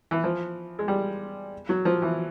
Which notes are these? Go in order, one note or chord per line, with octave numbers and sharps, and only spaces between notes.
E3
F3
G#3
G3
F#3
F3
E3